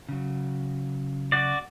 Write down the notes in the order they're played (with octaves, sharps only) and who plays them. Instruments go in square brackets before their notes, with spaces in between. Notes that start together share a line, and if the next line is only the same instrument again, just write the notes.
[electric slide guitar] C#3 F#3
[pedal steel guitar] F#4 D5